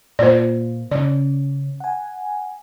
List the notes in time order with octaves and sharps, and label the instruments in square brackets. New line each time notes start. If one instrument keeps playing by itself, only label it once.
[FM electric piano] A#2 A#3 F4 [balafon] C5 D5
[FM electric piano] C#3 C#4 [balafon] D5
[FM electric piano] F#5 G#5